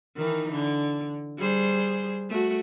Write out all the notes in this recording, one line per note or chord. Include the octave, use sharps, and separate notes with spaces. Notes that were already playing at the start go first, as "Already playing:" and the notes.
D#3 E3 D#4
D3
G3 G#4 C5
A3 F#4